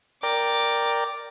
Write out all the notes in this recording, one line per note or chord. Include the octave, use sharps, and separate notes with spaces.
A#4 D5 G5 D6